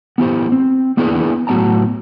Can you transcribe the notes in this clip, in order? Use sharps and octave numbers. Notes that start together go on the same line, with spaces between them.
B3 E4 G4 C5
C4
A#3 B3 D4 E4 G#4 B4
A2 F#3 B3 D5 A5 A#5